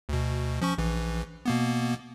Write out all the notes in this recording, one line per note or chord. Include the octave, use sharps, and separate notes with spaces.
D2 B2
F3 C#4 C#6
A#1 E3
B2 A#3 B3